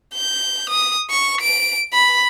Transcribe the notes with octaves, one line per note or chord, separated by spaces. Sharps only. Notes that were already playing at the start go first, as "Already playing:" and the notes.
G6
D#6
C#6
D7
B5